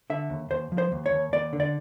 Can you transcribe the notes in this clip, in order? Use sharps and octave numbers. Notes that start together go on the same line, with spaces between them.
D3 E5
D#2
D#2 C5
F3
C5
D#2
C#5
D#2
D#2 D5
D3
D5